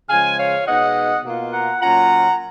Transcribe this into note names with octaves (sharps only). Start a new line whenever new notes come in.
C#3 F3 G#3 F5 G#5
C#5 F5
B2 G#3 B3 D#4 D#5 F#5
B2 A#3 F4
F#5 A#5
A#2 F#3 C#4 F4 F#5 A#5